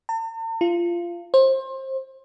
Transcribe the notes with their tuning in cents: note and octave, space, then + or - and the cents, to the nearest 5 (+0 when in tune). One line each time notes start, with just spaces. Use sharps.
A5 +45
F4 -20
C5 +25